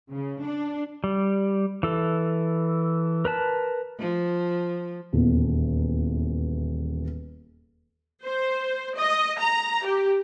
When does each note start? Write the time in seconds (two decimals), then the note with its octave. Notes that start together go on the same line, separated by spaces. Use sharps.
0.11 C#3
0.42 D4
1.04 G3
1.83 E3 A4
3.25 A#4 B4 A5
3.99 F3
5.13 D#1 E2
8.24 C5
8.96 D#5
9.39 A#5
9.85 G4